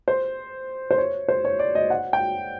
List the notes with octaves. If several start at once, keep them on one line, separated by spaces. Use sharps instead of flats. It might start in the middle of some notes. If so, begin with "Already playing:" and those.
C5
C5
C#5
C5
C#5
D5
D#5
F#5
G5